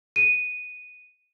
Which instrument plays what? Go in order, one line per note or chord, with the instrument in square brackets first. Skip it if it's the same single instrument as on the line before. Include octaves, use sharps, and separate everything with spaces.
[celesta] D#7